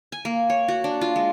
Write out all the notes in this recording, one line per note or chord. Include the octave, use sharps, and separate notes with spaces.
G#5
A#3
C#5
F#4
D4
F4
G#3